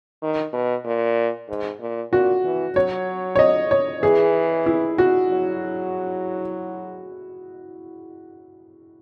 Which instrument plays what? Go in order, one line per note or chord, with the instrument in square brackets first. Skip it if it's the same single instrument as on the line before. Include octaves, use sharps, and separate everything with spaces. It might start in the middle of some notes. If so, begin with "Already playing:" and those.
[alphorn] D#3
B2
A#2
G#2
A#2
[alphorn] A#2 [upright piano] F#4
[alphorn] E3
[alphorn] F#3 [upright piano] C#5
[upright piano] C#5
D#5
C#5
[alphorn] E3 [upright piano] G#4
[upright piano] E4
F#4
[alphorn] F#3